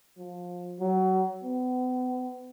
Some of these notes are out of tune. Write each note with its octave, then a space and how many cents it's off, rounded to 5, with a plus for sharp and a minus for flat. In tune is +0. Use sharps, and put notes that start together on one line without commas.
F3 +25
F#3 +25
B3 +35